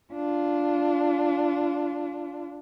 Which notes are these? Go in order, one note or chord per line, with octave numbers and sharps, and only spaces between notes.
D4 F4